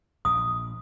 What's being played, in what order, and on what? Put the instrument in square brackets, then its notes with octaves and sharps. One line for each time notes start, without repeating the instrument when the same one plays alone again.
[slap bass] A#1 [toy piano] D#6